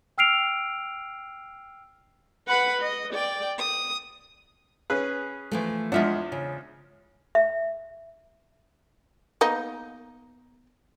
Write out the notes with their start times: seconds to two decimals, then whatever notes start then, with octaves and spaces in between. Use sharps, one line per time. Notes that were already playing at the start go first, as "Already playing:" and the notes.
0.18 G5 E6 F6 C7 D7 F7
2.48 B4 F#5 B5
2.82 D#5
3.13 D5 G5
3.58 D#6
4.90 C#4 G#4 B4
5.52 E3 F3 A3
5.92 E2 F3 G#3 D4 E5 F#5
6.32 C#3
7.35 E5
9.41 A#3 B3 D#4